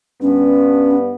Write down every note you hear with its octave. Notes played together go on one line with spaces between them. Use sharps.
G2 B3 C#4